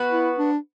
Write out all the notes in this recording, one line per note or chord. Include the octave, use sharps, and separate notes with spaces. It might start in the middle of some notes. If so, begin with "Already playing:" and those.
Already playing: B3 F#4 B4
E4
D4